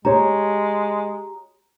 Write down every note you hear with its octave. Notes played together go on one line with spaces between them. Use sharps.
G#3 G4 C#5 A#5